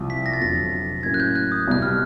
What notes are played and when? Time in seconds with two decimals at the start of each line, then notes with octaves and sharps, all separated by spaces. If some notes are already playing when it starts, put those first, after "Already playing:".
Already playing: C2 C3 F3
0.10 B6
0.26 A#6
0.33 A6
0.40 F1 F2 D3 F#3 A#6
1.03 A2 F#3 A#3 C#4 E4 G#6
1.14 F#6
1.20 G6
1.35 F#6
1.52 D#6
1.68 C2 B2 G3 F#6
1.82 F6